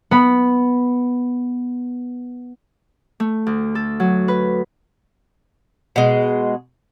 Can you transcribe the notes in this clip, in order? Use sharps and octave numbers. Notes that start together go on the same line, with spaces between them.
B3 B5
A3
D2
A4
F#3
B4
B2 G#3